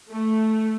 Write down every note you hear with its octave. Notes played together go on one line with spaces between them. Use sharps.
A3